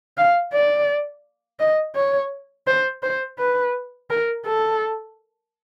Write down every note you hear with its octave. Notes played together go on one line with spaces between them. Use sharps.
F5
D5
D#5
C#5
C5
C5
B4
A#4
A4